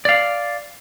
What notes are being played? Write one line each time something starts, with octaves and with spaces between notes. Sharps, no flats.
D5 F5